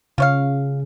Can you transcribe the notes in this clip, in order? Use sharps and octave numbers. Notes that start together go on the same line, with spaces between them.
C#3 F4 C#5 F5